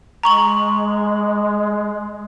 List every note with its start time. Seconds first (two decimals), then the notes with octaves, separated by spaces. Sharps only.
0.23 G#3 A#5 C#6 F#7